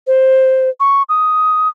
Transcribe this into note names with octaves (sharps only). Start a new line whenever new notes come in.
C5
C#6
D#6